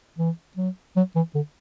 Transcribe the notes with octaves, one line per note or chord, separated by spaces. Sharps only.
E3
F#3
F#3
E3
D3